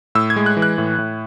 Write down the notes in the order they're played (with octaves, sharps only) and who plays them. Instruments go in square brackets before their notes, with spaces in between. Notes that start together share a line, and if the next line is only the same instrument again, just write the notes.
[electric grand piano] A2 E6
G#6
G#3
F#6
E3
F#6
A2
A2